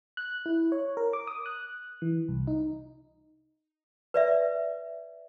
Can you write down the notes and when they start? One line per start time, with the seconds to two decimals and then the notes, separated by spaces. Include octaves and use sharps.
0.17 F#6
0.46 E4
0.72 C#5
0.97 A#4
1.13 D6
1.27 D#6
1.46 F#6
2.02 E3
2.28 C2
2.47 D#4
4.14 B4 D5 E5